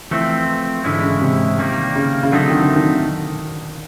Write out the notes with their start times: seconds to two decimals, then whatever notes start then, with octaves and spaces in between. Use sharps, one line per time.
0.11 E3 F3 A3 C4
0.84 G#2 D3 E3 G#3 C#4 E4
1.02 C#3
1.22 C3
1.58 D#3 G3 A#3
1.96 C#3
2.23 C#3
2.32 D3 F#3 A3 C4 D#4
2.50 D#3
2.63 D3
2.76 D#3